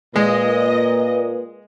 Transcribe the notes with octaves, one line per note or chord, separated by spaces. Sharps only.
A#2 G#3 B4 D#5